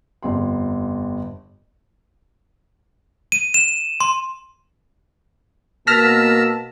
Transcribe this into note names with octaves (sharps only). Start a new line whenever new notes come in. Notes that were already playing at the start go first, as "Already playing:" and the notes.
G1 F2 C6
D#7
E7
C6
B2 A#3 A5 E6 F6 A#6 B6